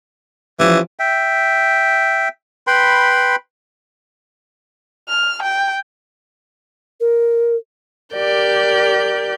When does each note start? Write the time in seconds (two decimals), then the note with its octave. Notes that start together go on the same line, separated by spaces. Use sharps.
0.60 E3 F3 C#4 G4
0.99 E5 G5
2.67 B4 G5 B5 C6
5.08 F6
5.43 G5
7.00 A#4
8.14 G4 A#4 D5 G6